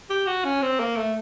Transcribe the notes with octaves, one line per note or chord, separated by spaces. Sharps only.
G4
F#4
C#4
C4
A#3
A3